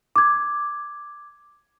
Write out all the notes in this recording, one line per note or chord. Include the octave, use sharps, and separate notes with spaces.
D6 G#6